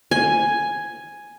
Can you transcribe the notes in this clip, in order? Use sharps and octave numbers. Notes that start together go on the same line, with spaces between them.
G#5